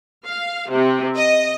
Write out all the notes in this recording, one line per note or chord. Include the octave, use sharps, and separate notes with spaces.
F5
C3
D#5